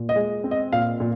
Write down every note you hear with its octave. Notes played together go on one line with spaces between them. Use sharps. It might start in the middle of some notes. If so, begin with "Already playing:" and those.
Already playing: A#2
D#5
G#3
C4
D#5
A#2 F5
A#2